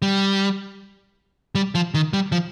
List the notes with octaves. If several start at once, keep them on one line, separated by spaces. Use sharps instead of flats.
G3
G3
F3
D#3
G3
F3